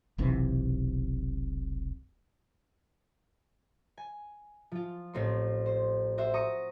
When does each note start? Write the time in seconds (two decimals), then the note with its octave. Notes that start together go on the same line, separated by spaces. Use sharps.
0.18 E1 B1 C3 E3
3.98 G#5
4.72 F3 F4
5.14 A1 C4 C6
5.66 C5
6.18 F#4 C5 E5
6.34 A#5 C#6 D#6